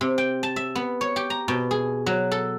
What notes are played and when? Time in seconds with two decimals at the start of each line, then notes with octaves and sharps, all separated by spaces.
0.01 C3
0.18 G5
0.43 A5
0.56 E5
0.75 B3
1.01 C#5
1.16 G4
1.30 A#5
1.48 B2
1.71 G#4
2.06 F#3
2.31 A4